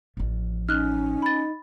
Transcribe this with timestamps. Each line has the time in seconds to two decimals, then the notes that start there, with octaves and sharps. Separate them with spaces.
0.17 A1 F3
0.69 C#4 D#4 F6 F#6
1.22 B5 A6